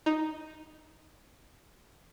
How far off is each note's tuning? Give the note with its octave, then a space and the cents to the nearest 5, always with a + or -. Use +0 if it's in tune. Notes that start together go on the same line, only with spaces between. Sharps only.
D#4 +0